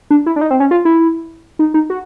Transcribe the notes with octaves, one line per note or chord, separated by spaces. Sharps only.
D4
E4
D4
D#4
C4
C#4
F4
E4
D#4
D#4
F#4